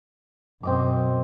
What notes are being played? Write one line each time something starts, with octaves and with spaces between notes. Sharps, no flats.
F#2 B2 C4 D#5 D6